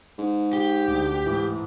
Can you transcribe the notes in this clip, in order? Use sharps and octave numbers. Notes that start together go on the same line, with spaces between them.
G#2
G4
D2
G#2 E3 A3